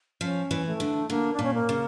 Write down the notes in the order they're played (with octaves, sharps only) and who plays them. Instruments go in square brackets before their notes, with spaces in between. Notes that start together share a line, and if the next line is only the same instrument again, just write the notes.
[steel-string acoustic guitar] F3 [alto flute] C#4
[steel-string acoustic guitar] E3
[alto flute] A3
[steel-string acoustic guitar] D3
[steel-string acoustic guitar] D3 [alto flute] A#3
[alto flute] D4
[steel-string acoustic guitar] A#2 [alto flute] C#4
[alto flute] A#3
[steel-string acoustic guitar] C#3